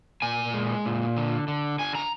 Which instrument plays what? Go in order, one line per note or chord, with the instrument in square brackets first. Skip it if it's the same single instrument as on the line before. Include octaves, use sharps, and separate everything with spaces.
[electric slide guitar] A#2 G#5
G#3
A#2
D3
D3
D3 G#5
A#5